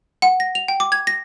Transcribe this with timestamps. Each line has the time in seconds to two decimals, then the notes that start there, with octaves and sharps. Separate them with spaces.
0.22 F#5
0.40 A#6
0.55 F7
0.68 G5
0.80 D6
0.92 G#6
1.07 A#6